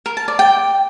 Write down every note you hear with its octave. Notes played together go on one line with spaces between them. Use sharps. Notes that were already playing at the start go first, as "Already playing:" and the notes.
A#4
A5
D5
G5